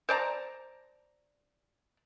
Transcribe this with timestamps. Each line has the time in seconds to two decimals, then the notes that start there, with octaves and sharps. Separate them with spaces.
0.09 C5 D5 A5 A#5